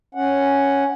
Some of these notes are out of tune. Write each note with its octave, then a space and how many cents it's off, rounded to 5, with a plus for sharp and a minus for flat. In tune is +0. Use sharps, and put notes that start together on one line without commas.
C#4 +0 F#5 +0